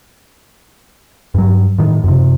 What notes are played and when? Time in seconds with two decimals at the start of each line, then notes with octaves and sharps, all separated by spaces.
1.34 G2 F#3
1.78 A2 D#3
2.04 F#2 C3